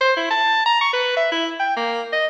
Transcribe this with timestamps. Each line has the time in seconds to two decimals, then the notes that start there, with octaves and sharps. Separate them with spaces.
0.01 C5
0.17 E4
0.31 A5
0.66 A#5
0.81 C#6
0.93 B4
1.17 E5
1.32 E4
1.60 G5
1.77 A#3
2.13 D#5